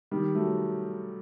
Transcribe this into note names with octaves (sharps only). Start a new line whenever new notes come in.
D#3 G3
F#3 A3